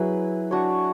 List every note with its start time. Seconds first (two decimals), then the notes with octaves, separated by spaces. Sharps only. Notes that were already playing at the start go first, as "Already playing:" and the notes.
Already playing: F#3 E4 G#4 B4
0.51 D4 F#4 C#5